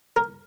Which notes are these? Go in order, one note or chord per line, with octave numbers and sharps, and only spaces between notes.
A#4